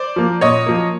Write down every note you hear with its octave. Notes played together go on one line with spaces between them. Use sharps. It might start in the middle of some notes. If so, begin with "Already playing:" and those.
Already playing: C5 D5
F3 A#3
A#2 C#5 D#5
F3 A#3